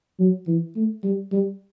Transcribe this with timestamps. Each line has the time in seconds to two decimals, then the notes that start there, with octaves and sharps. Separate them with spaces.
0.19 F#3
0.47 E3
0.76 A3
1.04 G3
1.32 G3